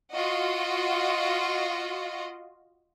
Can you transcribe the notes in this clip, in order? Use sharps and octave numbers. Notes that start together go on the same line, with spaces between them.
F4 F#4 D#5